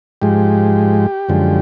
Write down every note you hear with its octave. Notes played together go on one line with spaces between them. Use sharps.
G#2 F3 G#3 G4
F#2 D3 F3 G#3